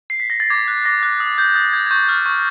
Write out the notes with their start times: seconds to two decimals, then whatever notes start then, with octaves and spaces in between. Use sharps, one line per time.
0.10 C7
0.20 B6
0.30 A#6
0.40 A6
0.50 D6 G#6
0.68 F#6
0.85 D6 A#6
1.03 F#6
1.20 D#6
1.38 G6
1.55 D#6 A6
1.73 G6 G#6
1.87 G#6
1.91 C#6 G6
2.09 F6
2.26 C#6